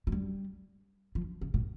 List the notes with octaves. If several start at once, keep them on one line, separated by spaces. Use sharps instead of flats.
F3
G3
F3
C#3
A#2